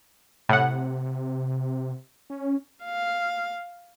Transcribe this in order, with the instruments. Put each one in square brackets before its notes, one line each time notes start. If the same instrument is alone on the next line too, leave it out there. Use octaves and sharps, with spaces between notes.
[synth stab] A2 F#5 [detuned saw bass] C3
[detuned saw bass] C#4
[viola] F5